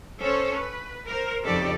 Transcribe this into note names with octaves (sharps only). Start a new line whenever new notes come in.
C#4 A4 C5 C#5
B4
A#4 C5
F2 C#3 D#4 G4 A4 D5